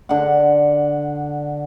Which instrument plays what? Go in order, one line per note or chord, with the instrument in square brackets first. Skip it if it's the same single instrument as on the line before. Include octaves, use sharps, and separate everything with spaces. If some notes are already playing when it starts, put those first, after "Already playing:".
[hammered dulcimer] D3 F#5